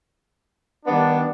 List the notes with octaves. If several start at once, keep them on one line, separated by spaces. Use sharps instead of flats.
D#3 G3 B3 D4